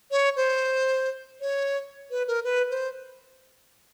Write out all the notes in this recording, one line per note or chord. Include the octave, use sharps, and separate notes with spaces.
C#5
C5
C#5
B4
A#4
B4
C5